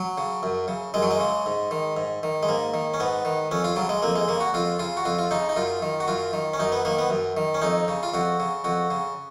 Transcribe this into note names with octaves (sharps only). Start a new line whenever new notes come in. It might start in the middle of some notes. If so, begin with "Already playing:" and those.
Already playing: F#3
C#3
F#2
C#3
F#2 G#3
F#3
G#3
C#3
G#2
D#3
G#2
D#3
G#3
G#2 A#3
D#3
C#4
G#2 B3
D#3
F2 C#4
F4
C#3 F#3
G#3
F2 A#3
G#3
C#3 A#3
F#4
F2 F4
C#3 F4
F#4
F2 F4
F4
C#3 D#4
D#4
F#2 F4
D#3
F#4
F#2 F4
D#3
C#4
F#2 D#4
B3
D#3 A#3
B3
F#2
D#3
C#4
F2 D#4
C#3
F4
F2 F#4
C#3
F2 F#4
C#3